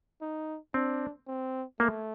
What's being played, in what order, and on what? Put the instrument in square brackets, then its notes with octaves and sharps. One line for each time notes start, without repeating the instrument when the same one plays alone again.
[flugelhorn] D#4
[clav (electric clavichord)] C4 [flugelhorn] D4
[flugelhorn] C4
[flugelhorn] A3 [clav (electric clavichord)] A#3